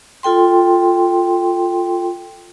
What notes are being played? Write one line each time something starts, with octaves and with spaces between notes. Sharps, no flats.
F4 A4 G5 C6